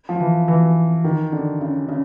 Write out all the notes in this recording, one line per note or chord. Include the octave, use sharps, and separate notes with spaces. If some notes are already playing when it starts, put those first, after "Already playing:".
F3
E3
E3
D#3
D3
C#3
C#3